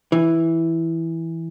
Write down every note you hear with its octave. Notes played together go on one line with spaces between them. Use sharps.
E3